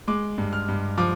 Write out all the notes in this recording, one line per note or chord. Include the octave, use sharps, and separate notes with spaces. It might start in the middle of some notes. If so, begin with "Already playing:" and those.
G#3 D6
G2
F6
G2
F3 D6